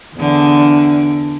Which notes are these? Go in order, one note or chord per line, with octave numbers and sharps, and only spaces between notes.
E2 D3